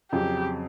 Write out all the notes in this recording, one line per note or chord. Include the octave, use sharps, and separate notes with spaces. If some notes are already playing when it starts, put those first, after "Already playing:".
F2 C#3 F#3 G4